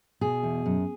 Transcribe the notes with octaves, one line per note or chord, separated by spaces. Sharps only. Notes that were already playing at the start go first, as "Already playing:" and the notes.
B2 G#4
E2
F#2